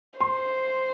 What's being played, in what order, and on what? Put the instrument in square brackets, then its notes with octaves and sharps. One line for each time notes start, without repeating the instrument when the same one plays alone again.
[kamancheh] C5 [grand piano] C6